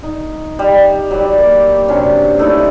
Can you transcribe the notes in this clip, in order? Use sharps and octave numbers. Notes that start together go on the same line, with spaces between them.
D#4
G3
F#3 G3 D5
A#3
C3 F#3 C#4 D4
A3 D#4 E4 D5